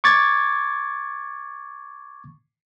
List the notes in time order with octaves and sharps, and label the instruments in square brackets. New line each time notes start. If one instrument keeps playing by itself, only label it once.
[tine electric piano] C#6 D6 G#6 A6